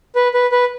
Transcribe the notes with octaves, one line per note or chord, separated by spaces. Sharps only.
B4
B4
B4